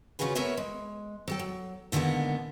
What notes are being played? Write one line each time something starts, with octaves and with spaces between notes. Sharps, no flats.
C#3 C#4 F4 F#4 G#4 B4
A3 B3 A#4 B4 C#5 E5
G#3
F#3 A4 G5
F#3
A#2 D3 D#3 G#3 A#3 B3